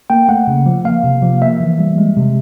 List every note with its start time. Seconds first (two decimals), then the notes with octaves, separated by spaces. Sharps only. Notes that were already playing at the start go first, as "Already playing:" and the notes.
0.10 A#3 G5
0.29 A3 F#5
0.47 C#3
0.66 F3
0.85 A#3 F5
1.04 C3
1.22 F3
1.41 A#3 E5
1.61 E3
1.79 G3
1.98 G#3
2.17 C3